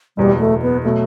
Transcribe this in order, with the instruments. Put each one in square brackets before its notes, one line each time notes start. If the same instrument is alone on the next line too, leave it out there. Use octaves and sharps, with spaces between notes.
[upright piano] F#1 E2 B2 [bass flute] G3
[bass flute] A3
B3
[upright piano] B2 F#3 [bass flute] A3